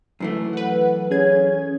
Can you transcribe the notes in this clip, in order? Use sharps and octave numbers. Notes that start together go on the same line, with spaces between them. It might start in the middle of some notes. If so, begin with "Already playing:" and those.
F#2 E3 A3
B4 F#5
C#4 G#4 G#6